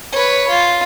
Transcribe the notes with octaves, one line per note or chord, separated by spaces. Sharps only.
B4 C#5
F4